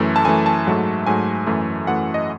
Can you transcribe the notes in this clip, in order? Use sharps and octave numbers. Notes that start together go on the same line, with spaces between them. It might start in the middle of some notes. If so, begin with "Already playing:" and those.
Already playing: F#2 E3 A3
A5
F#2 E3 A3 G#5
A5
G#2 F#3 A3
G#2 F#3 A3 G#5
F#2 E3 A3
F#2 E3 A3 F#5
D#5